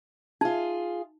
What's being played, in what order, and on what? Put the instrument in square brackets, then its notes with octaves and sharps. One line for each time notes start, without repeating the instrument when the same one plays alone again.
[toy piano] D#4 [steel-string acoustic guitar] F4 G#4